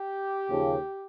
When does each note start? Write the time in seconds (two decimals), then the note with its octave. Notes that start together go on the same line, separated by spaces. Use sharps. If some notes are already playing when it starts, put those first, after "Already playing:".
Already playing: G4
0.49 D#2 C#3 F3